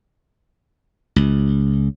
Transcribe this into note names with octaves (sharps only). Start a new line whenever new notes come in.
C#2